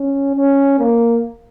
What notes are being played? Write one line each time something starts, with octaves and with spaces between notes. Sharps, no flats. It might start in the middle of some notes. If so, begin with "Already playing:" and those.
Already playing: C#4
C#4
A#3